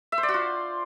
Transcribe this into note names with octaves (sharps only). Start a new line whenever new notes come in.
E5
C5
D5
F#4
F4